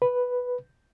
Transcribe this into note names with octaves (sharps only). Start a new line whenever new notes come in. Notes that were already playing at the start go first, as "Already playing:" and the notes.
B4